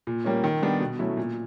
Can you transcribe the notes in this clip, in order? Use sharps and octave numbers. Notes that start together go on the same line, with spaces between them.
A#2
G3 A#3 C#4
D#3
G3 B3 D4
B2
F#3 A3 C#4 E4
A#2